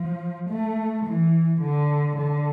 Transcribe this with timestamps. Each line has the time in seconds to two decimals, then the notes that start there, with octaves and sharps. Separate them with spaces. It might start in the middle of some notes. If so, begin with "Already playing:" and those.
Already playing: F3
0.50 A3
1.06 E3
1.61 D3
2.17 D3